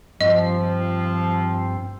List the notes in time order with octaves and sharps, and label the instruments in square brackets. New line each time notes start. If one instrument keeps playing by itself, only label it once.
[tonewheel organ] G2 C4 [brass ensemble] F3 [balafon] D#5